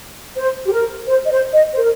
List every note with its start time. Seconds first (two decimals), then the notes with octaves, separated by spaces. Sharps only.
0.36 C5
0.66 G4
0.72 A#4
1.07 C5
1.25 D#5
1.31 C5
1.54 D#5
1.74 C5
1.77 A#4